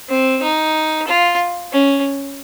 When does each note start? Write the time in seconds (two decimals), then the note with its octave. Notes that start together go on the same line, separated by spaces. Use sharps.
0.09 C4
0.42 D#4
1.07 F4
1.72 C#4